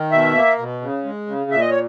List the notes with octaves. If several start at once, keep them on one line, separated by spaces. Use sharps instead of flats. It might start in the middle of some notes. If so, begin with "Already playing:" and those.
Already playing: D#3
B2 E5
A#3
B2
C#3
G#3
C#3
A#2 E5
D#5
C#5